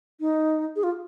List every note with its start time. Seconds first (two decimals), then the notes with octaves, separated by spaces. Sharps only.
0.20 D#4
0.76 G#4
0.83 F4